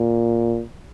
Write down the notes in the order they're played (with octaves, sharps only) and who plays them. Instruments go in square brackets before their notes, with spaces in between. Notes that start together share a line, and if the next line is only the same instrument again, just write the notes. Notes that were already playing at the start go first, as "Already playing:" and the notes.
Already playing: [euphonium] A#2